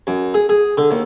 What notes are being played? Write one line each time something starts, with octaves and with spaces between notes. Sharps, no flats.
F#2
G#4
G#4
D3
D#2